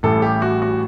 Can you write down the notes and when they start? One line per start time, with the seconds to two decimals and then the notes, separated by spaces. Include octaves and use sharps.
0.03 A1 A2 E3 G3 A4
0.22 G4
0.42 F#4
0.62 F#4